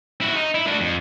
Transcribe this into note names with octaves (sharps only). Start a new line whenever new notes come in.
E4 F#4
D#4
E4
D4 F#4
F2